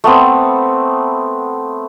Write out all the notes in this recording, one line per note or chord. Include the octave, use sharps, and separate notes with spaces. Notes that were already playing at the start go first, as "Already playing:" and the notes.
A3 B3 C4